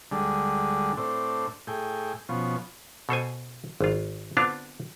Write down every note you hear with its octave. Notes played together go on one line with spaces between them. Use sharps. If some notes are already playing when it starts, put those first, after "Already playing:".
D2 D3 G3 G#3
A2 C4 D4
A2 G#4 G5
B2 F3 C#4
B2 A4 C5 G#5
G#1 F4
D3 B3 C4 D4 F4